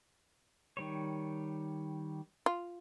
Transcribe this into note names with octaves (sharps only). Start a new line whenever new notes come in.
D#3 G3 C#5
F4